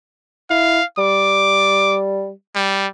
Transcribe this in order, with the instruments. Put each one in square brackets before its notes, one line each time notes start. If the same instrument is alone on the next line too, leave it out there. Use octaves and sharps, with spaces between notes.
[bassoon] E4 [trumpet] F5
[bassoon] G3 [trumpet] D6
[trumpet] G3